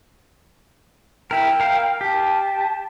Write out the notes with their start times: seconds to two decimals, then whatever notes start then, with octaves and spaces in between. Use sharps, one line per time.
1.31 E4 A#4 G5
1.60 A#4 F5
2.01 G4 A5